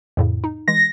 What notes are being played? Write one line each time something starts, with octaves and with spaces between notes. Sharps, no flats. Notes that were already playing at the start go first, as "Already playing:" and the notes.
F2 A2 C#3
D#4
E3 G#3 A#6